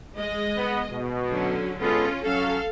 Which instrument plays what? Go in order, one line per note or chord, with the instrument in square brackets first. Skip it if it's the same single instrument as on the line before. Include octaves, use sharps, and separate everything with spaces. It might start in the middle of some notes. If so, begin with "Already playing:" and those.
[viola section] G#3 D#5
[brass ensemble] B3
B2
[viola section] D3 F#3 C#4
[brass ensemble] G#3 B3 A4 [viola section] C#4 F4
[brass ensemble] F#3 C#4 [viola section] A4 F5